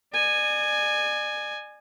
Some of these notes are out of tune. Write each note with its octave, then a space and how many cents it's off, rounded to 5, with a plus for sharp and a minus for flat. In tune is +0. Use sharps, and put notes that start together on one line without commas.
D5 +40 G#5 +0